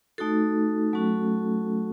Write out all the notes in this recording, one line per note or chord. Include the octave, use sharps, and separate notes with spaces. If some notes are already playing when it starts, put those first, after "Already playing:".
A3 D#4 F#4 A4
F#3 A3 C#4 F#4